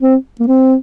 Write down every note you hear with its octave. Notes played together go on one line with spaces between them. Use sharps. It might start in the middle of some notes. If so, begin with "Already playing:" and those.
C4
A#3
C4